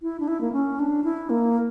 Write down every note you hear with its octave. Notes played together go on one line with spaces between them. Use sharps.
E4
D4
E4
A#3
C#4
D4
E4
A#3